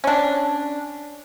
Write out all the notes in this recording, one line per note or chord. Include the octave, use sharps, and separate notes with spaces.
C#4 D4